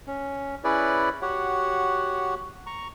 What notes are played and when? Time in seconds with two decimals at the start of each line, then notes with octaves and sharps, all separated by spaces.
0.07 C#4
0.64 C#4 E4 G#4 B4 C#5 D5
1.22 F#4 G4 C#5 F#5
2.66 A#5 C#6